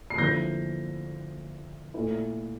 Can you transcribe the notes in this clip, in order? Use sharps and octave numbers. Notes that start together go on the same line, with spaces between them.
C7
D3 F3 A#3 E4 G6 A#6
A#2 A3 E4